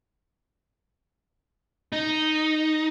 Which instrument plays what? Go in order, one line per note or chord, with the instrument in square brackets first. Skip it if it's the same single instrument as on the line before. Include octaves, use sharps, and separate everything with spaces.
[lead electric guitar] D#4